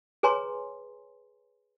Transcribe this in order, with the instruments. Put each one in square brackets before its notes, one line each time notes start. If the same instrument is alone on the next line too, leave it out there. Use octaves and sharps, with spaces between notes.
[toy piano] G#4 B4 C#5 G#5 A#5 C6